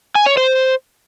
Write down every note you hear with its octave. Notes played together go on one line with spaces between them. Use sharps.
G#5
C#5
C5